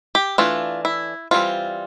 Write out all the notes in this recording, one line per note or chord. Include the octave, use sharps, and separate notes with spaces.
G4
E3 A3 D4 F4
E4
E3 G3 C4 F4